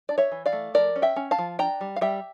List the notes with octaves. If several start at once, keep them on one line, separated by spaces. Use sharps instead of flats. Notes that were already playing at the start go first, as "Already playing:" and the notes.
D4 D5
C#5 E5
E3
D5 F5
A3
F3 A#4 D5
C#4
E5 G5
C#4
F5 A5
F3
D4 G5 A#5
G3
F5
G3 E5 G5